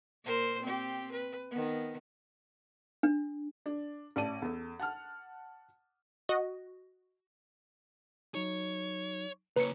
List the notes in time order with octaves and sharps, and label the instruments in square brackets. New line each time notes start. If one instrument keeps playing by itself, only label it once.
[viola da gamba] A#2 A#4 C5
C4 G4
B4
D#3 B3
[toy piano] D4
[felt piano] D4
A1 D5 A5 D#7
E2 A4
F#5 A5 F6
[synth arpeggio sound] F#4 D#5
[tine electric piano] F#3 D#4 [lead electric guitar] C#5
[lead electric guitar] C#3 A#3 [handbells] B4 C#7 [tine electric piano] C#5 A#5